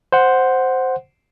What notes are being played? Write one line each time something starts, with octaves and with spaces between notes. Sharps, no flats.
C5 F#5